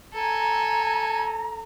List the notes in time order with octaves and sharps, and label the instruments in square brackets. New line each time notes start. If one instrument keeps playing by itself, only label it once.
[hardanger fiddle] A4 G#5 [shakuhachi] A#5